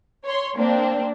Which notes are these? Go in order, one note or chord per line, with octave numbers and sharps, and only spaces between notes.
C#5 C6
A#3 C4 D4